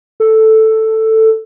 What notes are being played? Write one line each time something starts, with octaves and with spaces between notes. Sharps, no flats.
A4